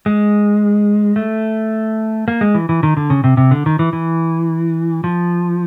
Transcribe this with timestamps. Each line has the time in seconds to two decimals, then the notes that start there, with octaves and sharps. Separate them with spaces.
0.06 G#3
1.16 A3
2.28 A#3
2.41 G#3
2.55 E3
2.69 E3
2.83 D#3
2.97 D3
3.10 C#3
3.24 C3
3.37 C3
3.51 D3
3.66 D#3
3.79 E3
3.93 E3
5.04 F3